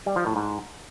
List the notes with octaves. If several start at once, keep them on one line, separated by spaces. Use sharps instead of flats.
G3
F3
A2
G#2